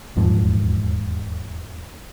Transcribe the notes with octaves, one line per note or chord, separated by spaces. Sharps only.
D#1 E2 G#2 F3